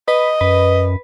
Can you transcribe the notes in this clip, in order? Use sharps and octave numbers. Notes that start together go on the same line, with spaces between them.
B4 D#5
F#2 B4